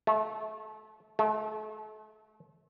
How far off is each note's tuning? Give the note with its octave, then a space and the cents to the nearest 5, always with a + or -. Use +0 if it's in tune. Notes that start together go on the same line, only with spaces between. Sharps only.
A3 -30
A3 -40